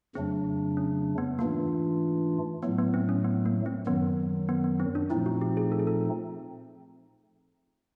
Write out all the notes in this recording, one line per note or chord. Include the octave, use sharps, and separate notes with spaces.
F2 C#3 F#3 A3 C4 D4
C#4
B3
G#2 E3 A3 A#3 D4 F4
A2 F#3 A3 B3
B3
C4
C#4
B3
A#3
C4
F#2 D#3 F#3 B3
B3
B3
C4
D4
A#2 F3 A3 C4 D#4 E4
F#4
G4
G#4
A4
G#4
A4